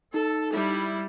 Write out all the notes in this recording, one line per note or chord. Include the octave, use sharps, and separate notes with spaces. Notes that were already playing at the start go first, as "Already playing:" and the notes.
D#4 A4
G3 E4